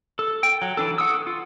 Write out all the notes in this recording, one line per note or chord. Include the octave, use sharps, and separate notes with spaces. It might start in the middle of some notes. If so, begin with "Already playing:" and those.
A4
G5
F#3
E3 D4 A4
A4 F#5 C#6 D#6 E6
F4